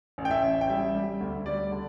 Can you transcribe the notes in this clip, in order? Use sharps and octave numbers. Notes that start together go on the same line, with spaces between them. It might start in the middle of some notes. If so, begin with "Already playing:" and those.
A1
G5
E5
A1
G5
G3 E5
G3
D2
G3 D5
D3